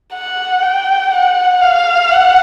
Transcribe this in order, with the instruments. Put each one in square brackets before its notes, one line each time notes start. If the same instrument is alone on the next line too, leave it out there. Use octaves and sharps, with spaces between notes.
[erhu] F#5
G5
F#5
F5
F#5